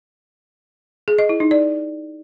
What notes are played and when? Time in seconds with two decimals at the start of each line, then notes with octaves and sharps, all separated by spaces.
1.08 G#4
1.19 D#5
1.29 E4
1.40 D#4
1.51 D5